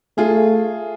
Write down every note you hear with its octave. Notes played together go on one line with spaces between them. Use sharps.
A3 F4 G#4